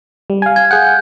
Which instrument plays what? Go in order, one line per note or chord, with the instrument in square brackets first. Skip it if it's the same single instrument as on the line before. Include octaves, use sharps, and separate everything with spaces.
[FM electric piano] G3
F5 G#5
[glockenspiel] G#6
[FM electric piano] G#4 F#5 [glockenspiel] G6